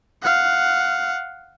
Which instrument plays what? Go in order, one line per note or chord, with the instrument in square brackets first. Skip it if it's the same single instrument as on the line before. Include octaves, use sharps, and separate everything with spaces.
[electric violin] F5 F#5